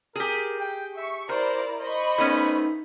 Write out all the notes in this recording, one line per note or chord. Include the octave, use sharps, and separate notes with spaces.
G4 G#4 A#4
G5
E5 C#6
E4 A#4 C5 D5
C5 D#5 B5 C#6
A3 B3 C#4 D#4